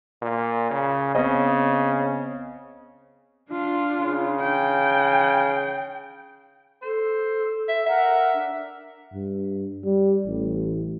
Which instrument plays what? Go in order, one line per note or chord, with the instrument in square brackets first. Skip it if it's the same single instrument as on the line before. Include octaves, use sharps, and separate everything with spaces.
[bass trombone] A#2
C#3
[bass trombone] C#3 [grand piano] B3 C4 D#5
[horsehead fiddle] D4 F4
[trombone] C#3
[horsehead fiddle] G5
[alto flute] A4 [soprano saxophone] C5
[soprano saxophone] E5
[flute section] A#4 F#5 [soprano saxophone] E5
[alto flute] D4
[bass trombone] G2
G3
A1